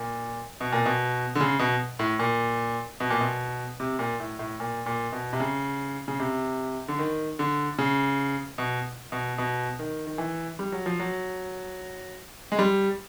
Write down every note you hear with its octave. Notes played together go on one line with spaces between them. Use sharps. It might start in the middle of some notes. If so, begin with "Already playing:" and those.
Already playing: A#2
B2
A#2
B2
D3
C#3
B2
A2
A#2
B2
A#2
B2
C3
A#2
A2
A2
A#2
A#2
B2
C3
C#3
C#3
C3
D3
D#3
D3
C#3
B2
B2
B2
D#3
D#3
E3
G3
F#3
F3
F#3
G#3
G3